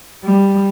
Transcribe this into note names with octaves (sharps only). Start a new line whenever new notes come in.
G3